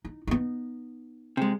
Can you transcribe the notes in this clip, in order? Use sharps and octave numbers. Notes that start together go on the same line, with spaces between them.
D#4
B3 D#4
C3 G#3